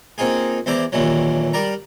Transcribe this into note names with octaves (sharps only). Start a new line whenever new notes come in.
A#3 C4 D#4 F4 G#4
E2 E4 C5 D5 A#5 D6
D#2 A#2 D3 E3 F#3
G3 A#4 D5 A#5